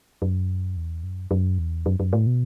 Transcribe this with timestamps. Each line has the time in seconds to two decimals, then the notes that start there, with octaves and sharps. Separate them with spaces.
0.22 F#2
0.77 E2
1.03 F#2
1.31 F#2
1.59 E2
1.86 F#2
2.00 F#2
2.13 A2
2.27 B2